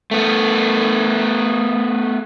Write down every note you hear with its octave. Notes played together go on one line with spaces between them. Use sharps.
A3 B3